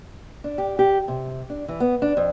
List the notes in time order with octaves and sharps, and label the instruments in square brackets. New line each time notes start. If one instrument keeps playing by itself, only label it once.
[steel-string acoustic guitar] D4
G4
G4
C3
D4
E3
B3
D4
F2